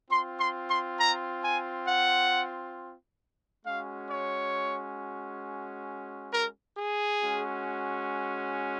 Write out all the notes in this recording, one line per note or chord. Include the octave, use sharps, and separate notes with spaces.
C4 F4 C6
C6
C6
A#5
G#5
F#5
G#3 C#4 F#4 F5
C#5
A#4
G#4
G#3 C#4 F#4